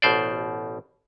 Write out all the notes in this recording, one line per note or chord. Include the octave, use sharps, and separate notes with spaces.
A1 B2 C5 D5